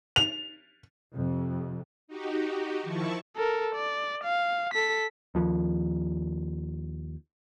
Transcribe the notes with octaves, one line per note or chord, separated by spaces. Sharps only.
F7
F2 C3
D#4 F#4 G4
D#3 F3 E4 A5 C#6
A4 A#4
D5
F5
A4 B6
D#2 F3